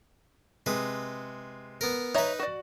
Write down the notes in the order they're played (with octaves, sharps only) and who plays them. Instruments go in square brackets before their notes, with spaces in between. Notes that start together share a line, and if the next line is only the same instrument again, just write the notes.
[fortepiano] C3 G#3 [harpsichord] B4 D#6
[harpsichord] B3 A#4
[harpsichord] D#4 B4 [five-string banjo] C#5 E5 A#5
[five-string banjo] F#4 D5